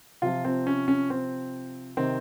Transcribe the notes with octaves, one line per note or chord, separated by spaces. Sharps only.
C3 F3 F4
C4
C#4
C#4
C4
C3 D#3 C4